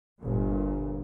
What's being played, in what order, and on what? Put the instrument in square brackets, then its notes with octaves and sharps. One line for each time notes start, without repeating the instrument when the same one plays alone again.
[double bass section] G1 A#2